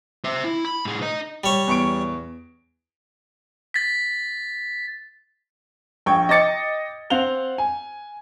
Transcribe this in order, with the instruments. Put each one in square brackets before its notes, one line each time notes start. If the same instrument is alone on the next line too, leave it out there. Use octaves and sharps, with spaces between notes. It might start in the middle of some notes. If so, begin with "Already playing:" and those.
[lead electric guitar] C5 E5
E4
B5
A2 G#4
D#5 A#5
[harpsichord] G3 C#5
[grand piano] E2 C#6 D7
[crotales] A6 B6
[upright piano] A#1 G5 C#6 G#6
D#5 G5 D6 A6 C#7
C4 F5 F#5 F7 G7
G#5